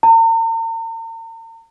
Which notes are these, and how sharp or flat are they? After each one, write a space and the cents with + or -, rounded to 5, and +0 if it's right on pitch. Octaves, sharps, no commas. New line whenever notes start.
A#5 -45